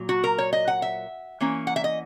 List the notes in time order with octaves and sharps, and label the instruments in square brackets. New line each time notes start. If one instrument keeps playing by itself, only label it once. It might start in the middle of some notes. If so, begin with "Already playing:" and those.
Already playing: [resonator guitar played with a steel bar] A#2 F#3
F#4
A#4
C#5
D#5
F#5
E5
E3 A#3 C#4
F#5
E5
D#5